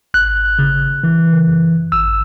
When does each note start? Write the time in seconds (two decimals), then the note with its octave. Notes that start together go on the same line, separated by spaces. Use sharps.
0.14 G#1 F#6
0.59 C#3
1.04 E3
1.48 F#2
1.92 G#1 E6